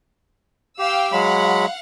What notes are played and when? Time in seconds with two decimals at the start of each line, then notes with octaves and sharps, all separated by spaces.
0.79 G4 F5 G5 E6
1.12 F#3 G#3 F5 F#5 B5